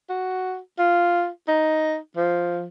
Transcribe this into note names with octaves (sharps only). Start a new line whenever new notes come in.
F#4
F4
D#4
F3